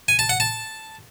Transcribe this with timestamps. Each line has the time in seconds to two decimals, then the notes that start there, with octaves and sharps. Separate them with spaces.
0.08 G#5
0.19 A5
0.29 F#5
0.40 A5